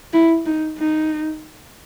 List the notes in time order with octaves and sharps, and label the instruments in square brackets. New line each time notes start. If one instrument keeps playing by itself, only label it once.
[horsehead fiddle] E4
D#4
D#4